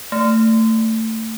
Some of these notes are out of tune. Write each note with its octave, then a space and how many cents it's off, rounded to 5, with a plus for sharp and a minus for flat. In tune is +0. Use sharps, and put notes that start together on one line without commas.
A3 +25